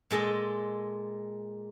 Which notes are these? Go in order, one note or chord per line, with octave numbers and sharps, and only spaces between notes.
A#2 G#3 A4 D#5